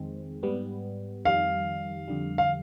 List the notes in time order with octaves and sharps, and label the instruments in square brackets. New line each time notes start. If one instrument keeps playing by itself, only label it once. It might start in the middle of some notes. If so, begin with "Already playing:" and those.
Already playing: [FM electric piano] F2 D#3 G#3 C4
G#2 G3 B3
[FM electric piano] F2 D#3 G3 [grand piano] F5
[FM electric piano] F2 D3 G3
[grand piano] F5